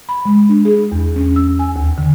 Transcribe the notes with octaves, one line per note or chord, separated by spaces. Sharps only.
B5
G#3
D4
G#4
E2
C#4
E6
G#5
D#2
D3